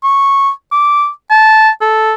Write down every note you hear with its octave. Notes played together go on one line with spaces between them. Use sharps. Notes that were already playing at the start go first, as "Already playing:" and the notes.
C#6
D6
A5
A4